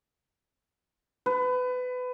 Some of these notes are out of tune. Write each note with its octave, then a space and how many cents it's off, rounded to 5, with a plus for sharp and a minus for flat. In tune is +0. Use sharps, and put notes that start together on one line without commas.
B4 +25